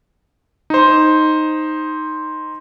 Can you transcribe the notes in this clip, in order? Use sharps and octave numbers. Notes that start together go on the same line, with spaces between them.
D#4 C5